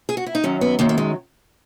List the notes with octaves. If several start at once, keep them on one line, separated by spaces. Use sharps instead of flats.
G#4
F#4
E4
D#4
F#2 D#3 F#3 C#4
B3
F#2 D#3 F#3 A#3
A#3
G#3